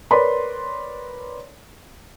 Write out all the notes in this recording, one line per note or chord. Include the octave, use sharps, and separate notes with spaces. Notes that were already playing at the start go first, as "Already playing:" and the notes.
A#4 B4 C#5 D5 B5 C6